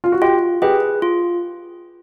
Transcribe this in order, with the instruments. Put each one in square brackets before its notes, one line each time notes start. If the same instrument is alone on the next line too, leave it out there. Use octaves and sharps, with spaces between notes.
[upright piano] F4
F#4
[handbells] F4 [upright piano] G4
[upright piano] G4 [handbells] G#4 B4
[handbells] F4